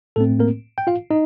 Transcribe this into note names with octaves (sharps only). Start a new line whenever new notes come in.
A2 A3 C4 A4
A#3 A#4
G5
F4 F5
D#4 D#5